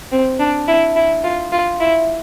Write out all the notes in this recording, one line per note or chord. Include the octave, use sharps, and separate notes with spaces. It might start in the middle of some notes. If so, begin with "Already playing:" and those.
C4
D4
E4
E4
F4
F4
E4